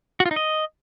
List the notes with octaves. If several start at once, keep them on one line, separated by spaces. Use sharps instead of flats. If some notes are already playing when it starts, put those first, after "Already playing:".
F#4
F4
D#4
D#5